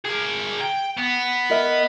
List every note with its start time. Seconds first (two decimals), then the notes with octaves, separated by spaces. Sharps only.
0.05 G#4 A#4
0.60 G5
0.97 B3
1.50 A#4 D#5 E5